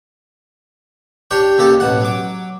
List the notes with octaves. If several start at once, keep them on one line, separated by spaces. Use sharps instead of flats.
D4 G4 C#5 G5
D#2 C#3 G4 A4
A1 B2 F#5
F#3 D6